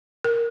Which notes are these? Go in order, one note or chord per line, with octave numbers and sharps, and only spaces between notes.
A#4